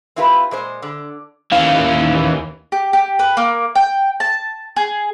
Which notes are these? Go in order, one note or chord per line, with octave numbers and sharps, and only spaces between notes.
C4 E4 F4 G4 A#4 B4
A#2 G#3 C5
D3
D#2 E3 C#4 F5
G4
G4
B4
A#3
G5
A5
G#4